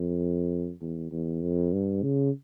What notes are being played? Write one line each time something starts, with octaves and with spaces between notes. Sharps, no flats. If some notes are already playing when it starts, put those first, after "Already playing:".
Already playing: F2
E2
E2
F2
G2
C#3